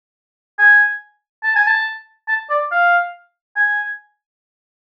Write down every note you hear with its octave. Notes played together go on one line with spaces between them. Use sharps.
G#5
A5
G#5
A5
A5
D5
F5
G#5